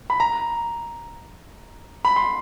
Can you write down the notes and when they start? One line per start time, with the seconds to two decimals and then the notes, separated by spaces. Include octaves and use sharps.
0.10 B5
0.20 A#5
2.05 B5
2.16 C6